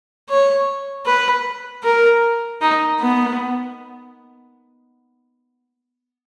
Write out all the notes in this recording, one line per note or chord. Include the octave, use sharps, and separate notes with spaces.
C#5
B4
A#4
D#4
B3